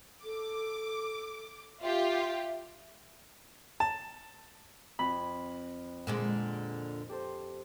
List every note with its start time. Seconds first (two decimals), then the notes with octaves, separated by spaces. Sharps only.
0.24 A4 D6
1.82 F4 G4 E5
3.80 A5
4.99 F2 B5
6.07 A#2 D3 G#3
7.09 G4 A4 C5